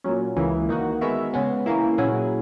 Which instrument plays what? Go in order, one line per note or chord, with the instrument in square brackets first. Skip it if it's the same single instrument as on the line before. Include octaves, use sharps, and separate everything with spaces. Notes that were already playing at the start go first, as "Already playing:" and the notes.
[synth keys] A#2 F#3 C#4
C#2 C#3 E3 A#3
D#3 A#3 D#4 F#4
G#3 B3 F#4 A#4 E5
C#3 G#3 B3
C#3 E3 A#3 E4
A#2 F#3 C#4 E4 G#4